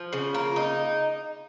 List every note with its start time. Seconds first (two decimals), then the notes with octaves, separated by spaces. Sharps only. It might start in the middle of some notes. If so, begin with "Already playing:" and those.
Already playing: F3
0.13 C#3
0.34 A#3
0.56 D#4